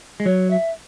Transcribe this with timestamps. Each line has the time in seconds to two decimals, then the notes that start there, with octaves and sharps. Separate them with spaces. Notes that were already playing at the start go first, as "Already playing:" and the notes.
0.20 G#3
0.25 F#3 C#5
0.50 E5